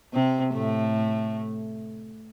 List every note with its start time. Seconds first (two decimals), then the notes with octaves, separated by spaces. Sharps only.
0.13 C3 C4
0.53 A2 A3